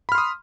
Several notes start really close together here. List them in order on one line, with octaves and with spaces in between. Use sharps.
B5 F6 C6 D#6